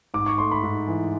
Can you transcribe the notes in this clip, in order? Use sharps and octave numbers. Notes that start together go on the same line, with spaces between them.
G#2 D6
C#6
A3 C6
B5
G#2
E3